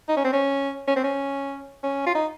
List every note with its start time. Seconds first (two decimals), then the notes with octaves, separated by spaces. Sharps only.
0.09 D#4
0.17 C#4
0.25 C4
0.33 C#4
0.88 C#4
0.96 C4
1.04 C#4
1.83 C#4
2.06 F4
2.15 D#4